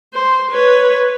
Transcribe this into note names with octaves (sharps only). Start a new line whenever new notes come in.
C5
B4 C#5